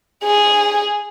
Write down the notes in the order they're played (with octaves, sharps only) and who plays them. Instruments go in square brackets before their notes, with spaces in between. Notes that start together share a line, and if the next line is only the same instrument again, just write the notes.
[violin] G#4